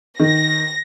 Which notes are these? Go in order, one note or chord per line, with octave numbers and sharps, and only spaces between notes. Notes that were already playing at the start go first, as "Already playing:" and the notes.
D#3 A#6